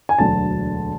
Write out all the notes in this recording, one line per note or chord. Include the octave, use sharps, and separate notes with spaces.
G#5
E1 D2 D3 F#3 A5